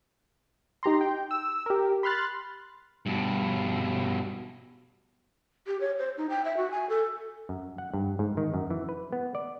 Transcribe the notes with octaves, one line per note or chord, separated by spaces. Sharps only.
D#4 G4 A#5 C6
G5
E6
G4 A#4
B5 C6 F6 F#6 A6
G2 B2
G4
C#5
C5
D#4
G5
E5
F#4
G#5
A4
F#2
F#5
G2
G#2
D#3
F#2
E3
B4
B3
D5